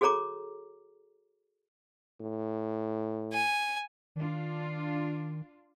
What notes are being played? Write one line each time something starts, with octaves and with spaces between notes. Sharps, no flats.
F#4 G#4 A4 C#5 A#5 D6
A2
G#5
D#3 D4 F4